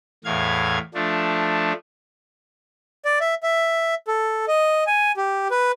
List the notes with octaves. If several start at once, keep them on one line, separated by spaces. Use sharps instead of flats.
E2 A2 F5 G#6
F3 A3 D4
D5
E5
E5
A4
D#5
G#5
G4
B4